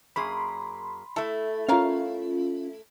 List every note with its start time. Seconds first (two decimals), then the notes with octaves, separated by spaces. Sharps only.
0.16 F#2 A#3 G#4 B5 C6
1.16 A3 E4 A4
1.68 C#4 F4 A#4 C#5 F5